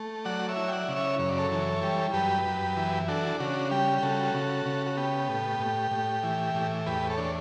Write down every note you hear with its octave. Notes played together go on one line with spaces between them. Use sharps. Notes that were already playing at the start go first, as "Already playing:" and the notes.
Already playing: A3
F#3 D5 F#5
C#5 E5
E4
G5
D5 F#5
C#3
C#5 E5
F#2 C#5
D5
A4 C#5
E3
G3
F#2 G4 B4
F#2
E3
D4 F#4 A4
C#3 F#4
G3 G4
G4
C#3 F#4 A4
C#3
C#3
F#4
B3 G4
A2
A2
A2
E3
A2
E2 G4 B4
A4 C#5
D4